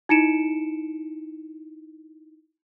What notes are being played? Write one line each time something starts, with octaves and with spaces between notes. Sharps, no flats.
D#4 E4 C#7 D7 E7